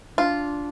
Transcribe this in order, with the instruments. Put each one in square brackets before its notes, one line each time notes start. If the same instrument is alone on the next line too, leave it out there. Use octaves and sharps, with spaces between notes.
[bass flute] D4 [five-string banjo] F4